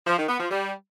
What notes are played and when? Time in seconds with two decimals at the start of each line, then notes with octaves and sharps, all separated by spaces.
0.06 F3
0.18 D#3
0.29 B3
0.40 F3
0.51 G3